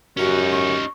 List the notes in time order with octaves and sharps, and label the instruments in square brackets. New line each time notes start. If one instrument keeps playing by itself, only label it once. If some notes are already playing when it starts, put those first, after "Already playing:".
[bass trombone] F#2 [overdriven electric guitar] C#4 D#4 [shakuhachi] F#4 [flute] G4
[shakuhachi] C#6